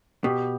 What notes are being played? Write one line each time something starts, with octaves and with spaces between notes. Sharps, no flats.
B2 G4